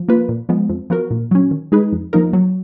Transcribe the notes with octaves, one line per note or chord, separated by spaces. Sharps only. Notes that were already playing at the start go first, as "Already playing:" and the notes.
Already playing: F3
A#3 F4 B4
A#2
F3 G#3 B3
F2
F3 B3 F#4 A#4
A#2
F#3 C#4
D#3
G#3 D#4 G#4 B4
F2
F3 A#3 D#4 A#4
F#3